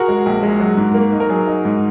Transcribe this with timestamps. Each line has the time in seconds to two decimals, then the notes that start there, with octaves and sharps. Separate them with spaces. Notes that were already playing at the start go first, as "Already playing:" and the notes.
Already playing: F#4 G#4 A#4
0.08 G#3
0.26 A#1
0.43 G#3
0.60 F#3
0.77 G#2
0.94 A#3
1.13 D#4
1.20 A#4
1.29 F#3 G#4
1.47 D#4
1.65 G#2